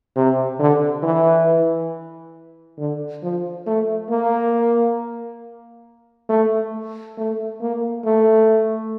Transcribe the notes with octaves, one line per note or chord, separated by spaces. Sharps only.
C3
D3
E3
D3
F3
A3
A#3
A3
A3
A#3
A3